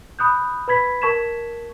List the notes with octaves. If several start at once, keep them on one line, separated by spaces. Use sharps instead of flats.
B5 D#6 F#6 G6
B4 B5 G#6 B6
A#4 A5 C#6 G#6 B6 E7